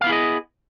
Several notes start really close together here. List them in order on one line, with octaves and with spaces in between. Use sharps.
F5 B3 E4 G#4 D#5